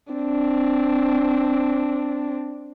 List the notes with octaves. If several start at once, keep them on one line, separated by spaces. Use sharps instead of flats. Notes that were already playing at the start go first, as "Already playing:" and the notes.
C4 D4